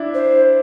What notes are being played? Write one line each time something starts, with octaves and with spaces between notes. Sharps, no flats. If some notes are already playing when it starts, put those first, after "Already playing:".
Already playing: D4 E4
C5